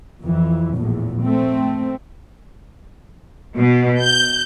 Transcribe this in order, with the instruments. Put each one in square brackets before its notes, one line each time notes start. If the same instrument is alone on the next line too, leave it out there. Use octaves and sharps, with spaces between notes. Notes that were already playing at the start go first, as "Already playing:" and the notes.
[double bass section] F2 E3
A#1 E2 A2
A3 C4
[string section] B2
G6